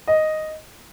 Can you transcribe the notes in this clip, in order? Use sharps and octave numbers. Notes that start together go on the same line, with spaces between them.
D#5